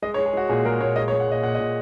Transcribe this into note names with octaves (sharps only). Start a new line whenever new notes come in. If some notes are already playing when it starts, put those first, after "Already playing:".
G#3 D#5
C#5
G#3
G#4
G#3 F#4
A#2 G#4
G#3 A#4
A#2 C#5
G#3 D#5
C#5
G#3
F#5
A#2 D#5
A#2 F#5
D#5
A#2